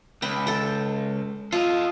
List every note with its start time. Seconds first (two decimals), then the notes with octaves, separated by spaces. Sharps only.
0.22 C#2 G5 B5
0.47 A4 G5
1.52 F4 A4 D#5